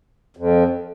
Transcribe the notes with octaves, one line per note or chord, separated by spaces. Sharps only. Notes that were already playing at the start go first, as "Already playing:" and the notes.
F2